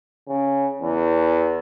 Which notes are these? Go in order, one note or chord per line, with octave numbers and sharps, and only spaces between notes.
C#3
E2